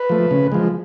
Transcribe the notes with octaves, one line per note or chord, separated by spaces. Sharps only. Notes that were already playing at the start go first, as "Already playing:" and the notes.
Already playing: B4
F3 A3
C#3
F3 G#3